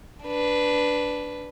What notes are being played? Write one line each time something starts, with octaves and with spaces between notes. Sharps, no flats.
D4 B4